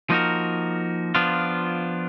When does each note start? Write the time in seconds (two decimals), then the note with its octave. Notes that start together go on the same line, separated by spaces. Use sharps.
0.10 F3 A#3 D#4 F#4 A#4
1.15 F3 B3 D4 F4